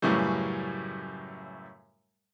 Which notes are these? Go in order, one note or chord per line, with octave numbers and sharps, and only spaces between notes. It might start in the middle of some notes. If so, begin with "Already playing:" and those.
F#2 A2 C#3 E3 G3